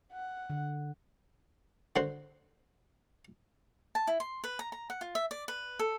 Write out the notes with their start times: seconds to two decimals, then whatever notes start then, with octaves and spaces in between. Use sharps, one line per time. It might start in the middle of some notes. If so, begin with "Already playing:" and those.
0.12 F#5
0.50 D3
1.96 D3 F#4 C5
3.95 A5
4.07 E4
4.20 C6
4.44 B4
4.59 A#5
4.72 A#5
4.90 F#5
5.01 F4
5.15 E5
5.31 D5
5.48 B4
5.79 A4